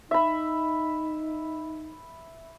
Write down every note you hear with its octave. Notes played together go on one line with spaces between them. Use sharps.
D#4 E5 B5